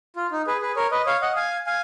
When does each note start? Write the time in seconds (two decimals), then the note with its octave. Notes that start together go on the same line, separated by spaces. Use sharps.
0.16 F4
0.31 D#4
0.47 G#4 B4
0.61 G#4 B4
0.76 A#4 C#5
0.92 B4 D#5
1.06 C#5 F5
1.22 D#5 F#5
1.36 F5 G#5
1.67 F5 G#5